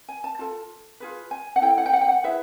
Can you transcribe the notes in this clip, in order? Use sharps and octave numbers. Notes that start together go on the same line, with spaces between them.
G#5
A5
F4 A4 A5
F4 G#4 B4
G#5
F#5
E4 A4 G5
F#5
G5
F#5
G5
F#5
E4 G#4 B4 E5